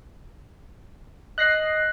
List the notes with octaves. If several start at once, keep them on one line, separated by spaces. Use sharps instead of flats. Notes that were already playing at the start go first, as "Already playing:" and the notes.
D#5 F#6 A#6 C7